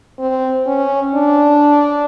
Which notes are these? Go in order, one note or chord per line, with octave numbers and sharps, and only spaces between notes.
C4
C#4
D4